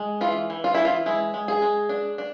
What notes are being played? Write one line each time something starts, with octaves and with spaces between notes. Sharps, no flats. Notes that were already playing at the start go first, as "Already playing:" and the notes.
Already playing: G#3
E3 F4
E3
F4
E3 E4
F4
G#3 E4
G#3
G#4
G#3
D4
D4